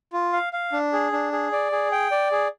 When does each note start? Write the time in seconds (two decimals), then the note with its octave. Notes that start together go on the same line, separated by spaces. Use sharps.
0.13 F4
0.33 F5
0.53 F5
0.72 D4
0.93 G#4
1.12 D4
1.33 G#4
1.52 D5
1.72 G#4
1.92 G5
2.11 D5
2.31 G#4